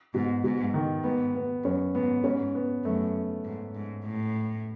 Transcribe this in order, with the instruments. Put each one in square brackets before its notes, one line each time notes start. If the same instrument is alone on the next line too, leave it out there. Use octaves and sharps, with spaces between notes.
[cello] G#2 [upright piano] B2
[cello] G#2 [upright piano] B2
[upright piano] D#3
[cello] G#2 [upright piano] B3
[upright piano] B3
[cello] F#2 [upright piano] C#4
[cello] G#2 [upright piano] B3
[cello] G#2 [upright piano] C#4
[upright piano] B3
[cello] F#2 [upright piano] A3
[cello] G#2
G#2
A2